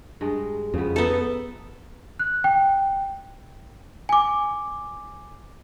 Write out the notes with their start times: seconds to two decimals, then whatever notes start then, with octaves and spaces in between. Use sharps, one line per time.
0.21 G2 G#3 G#4
0.74 F2 C#3 B3
0.96 B3 D#4 A4 E5
2.19 F#6
2.44 G5
4.09 G#5 D6